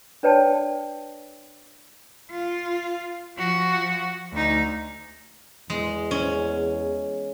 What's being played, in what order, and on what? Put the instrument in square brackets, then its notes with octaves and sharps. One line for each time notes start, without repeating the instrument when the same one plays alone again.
[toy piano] D4 B4 C#5 D5 G5 A5
[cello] F4
F3 F#4
D2 D#4
[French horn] E2 [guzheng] G#3
[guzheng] C#4